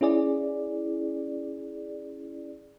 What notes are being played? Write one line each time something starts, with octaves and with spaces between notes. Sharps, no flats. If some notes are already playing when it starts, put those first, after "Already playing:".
C#4 E4 G#4 D5